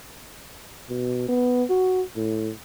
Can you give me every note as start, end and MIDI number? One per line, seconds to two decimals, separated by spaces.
0.89 1.24 47
1.28 1.64 59
1.69 2.02 66
2.16 2.52 45